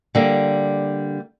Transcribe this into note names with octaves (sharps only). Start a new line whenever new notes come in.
D3 G3 A#3